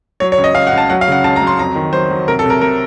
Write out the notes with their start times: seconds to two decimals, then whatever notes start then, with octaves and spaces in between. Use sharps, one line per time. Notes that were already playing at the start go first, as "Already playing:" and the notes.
0.20 F#3 C#5
0.32 C#5
0.38 C#2
0.44 D#5
0.55 C#2 F5
0.67 F#5
0.72 C#2
0.78 A5
0.90 F#3 F#5
1.01 F5
1.08 C#3 F#5
1.24 C#2 A5
1.36 A#5
1.41 F#3
1.47 C6
1.59 F2 A#5
1.76 D#3
1.93 F#3 C5
2.11 F#3
2.28 C3 A#4
2.39 A4
2.45 C2 A#4
2.61 C3 A#4